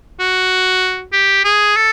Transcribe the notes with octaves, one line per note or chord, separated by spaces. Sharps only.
F#4
G4
G#4
A4